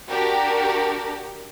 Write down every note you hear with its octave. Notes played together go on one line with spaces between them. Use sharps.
D4 F#4 G4 A#4